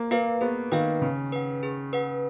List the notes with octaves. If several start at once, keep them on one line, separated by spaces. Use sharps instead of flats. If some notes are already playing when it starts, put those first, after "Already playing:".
Already playing: A#3
A#3 B4 F5
B3 G#4
D#3 B4 F5
C#3 G#4
B4 F#5
G#4
B4 F#5